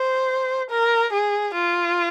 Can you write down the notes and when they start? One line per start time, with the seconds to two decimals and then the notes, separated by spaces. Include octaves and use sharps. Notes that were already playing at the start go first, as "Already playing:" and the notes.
Already playing: C5
0.70 A#4
1.13 G#4
1.55 F4